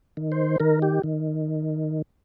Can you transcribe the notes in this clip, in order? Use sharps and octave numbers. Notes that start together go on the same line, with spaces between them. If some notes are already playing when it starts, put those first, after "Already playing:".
D#3
C5
D#3 A#4
G4
D#3